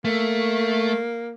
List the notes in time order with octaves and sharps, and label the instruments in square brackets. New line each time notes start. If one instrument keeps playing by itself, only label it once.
[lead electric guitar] A3 [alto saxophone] A#3